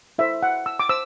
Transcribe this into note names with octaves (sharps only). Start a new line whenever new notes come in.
E4 A4 C5 E5
F#5
E6
D6
C5 E6